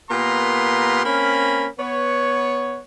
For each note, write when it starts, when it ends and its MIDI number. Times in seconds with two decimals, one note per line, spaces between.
0.11 1.03 46
0.11 1.03 58
0.11 1.03 59
0.11 1.03 67
0.11 1.03 82
0.11 1.03 84
1.05 1.66 58
1.05 1.66 60
1.05 1.66 61
1.05 1.66 70
1.05 1.66 83
1.79 2.80 59
1.79 2.80 73